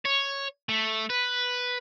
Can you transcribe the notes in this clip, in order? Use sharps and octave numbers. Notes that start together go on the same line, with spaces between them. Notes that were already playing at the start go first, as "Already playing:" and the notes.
C#5
A3
B4